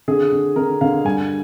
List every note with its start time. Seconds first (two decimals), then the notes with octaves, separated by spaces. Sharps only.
0.08 D3 G#4
0.32 D3
0.56 D3 A#4
0.81 D3 F5
1.05 G2 G#5